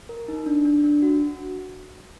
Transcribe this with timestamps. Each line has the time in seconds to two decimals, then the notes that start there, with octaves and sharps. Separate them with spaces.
0.09 A#4
0.28 D#4
0.46 D4
0.65 D4
0.84 D4
1.02 F#4